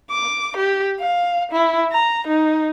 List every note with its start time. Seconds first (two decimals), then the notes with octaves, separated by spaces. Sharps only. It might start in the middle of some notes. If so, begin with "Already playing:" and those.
0.10 D6
0.57 G4
1.00 F5
1.52 E4
1.92 A#5
2.27 D#4